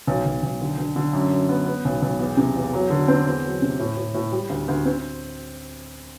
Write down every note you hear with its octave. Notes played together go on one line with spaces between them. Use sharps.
B1
B1
B1
D3
D3
D3
F#2
F#2
B3
B3
B1
B1
E2
C3
E2
F#3
D3
C4
E2
F#3
C3
A2
A2
A2
G3
D2
D2
C4